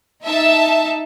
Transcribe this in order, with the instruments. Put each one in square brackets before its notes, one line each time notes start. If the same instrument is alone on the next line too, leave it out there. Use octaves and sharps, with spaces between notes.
[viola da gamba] D#4 [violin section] E5 A5